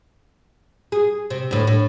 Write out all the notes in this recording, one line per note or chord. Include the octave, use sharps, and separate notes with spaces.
G#4
C3
D2 A2
A2